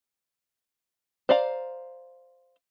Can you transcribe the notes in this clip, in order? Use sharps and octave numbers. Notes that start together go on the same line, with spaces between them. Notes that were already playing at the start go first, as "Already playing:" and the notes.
C5 D5 F5 A#5